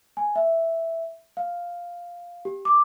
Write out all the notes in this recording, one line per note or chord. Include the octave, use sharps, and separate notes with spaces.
G#5
E5
F5
G4
D6